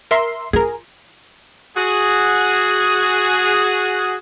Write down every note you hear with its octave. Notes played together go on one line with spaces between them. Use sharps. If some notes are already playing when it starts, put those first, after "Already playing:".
A#4 E5 C6
F4 G#4 A#4
F#4 G#4